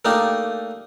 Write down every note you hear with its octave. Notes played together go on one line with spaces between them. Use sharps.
A3 A#3 D4 D#4 G4